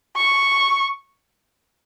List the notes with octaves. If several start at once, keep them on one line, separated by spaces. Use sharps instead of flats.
C#6